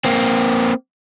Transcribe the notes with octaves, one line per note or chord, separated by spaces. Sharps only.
A#3 C4